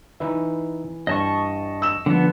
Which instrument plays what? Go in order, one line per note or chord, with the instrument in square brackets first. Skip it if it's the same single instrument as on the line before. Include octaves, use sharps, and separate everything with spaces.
[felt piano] E3 [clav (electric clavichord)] D#4 B4 E5
[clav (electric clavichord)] G2 [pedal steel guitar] D#5 A5 C#6
[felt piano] E6 E7
[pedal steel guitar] D3 B3 [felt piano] F3